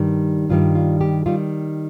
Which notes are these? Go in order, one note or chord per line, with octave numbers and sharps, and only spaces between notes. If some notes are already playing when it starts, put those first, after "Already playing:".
Already playing: G2 D#3 G3
G2 D#3 G3 F4
F4
G4
D#3 G3 F4